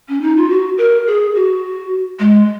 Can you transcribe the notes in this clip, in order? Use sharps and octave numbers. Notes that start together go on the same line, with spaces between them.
C#4
D#4
F4
F#4
A#4
G#4
F#4
G#3